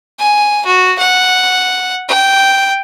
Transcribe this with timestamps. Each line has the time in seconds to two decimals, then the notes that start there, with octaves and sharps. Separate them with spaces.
0.19 G#5
0.66 F#4
0.99 F#5
2.08 G5